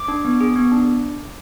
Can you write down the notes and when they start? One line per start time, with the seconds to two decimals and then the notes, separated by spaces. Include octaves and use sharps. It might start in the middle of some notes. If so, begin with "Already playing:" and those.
Already playing: D6
0.08 D4
0.25 B3
0.41 G#4
0.56 B3
0.72 D4